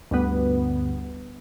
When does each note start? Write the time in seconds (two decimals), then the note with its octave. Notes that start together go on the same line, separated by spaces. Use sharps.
0.11 D2 G2 B3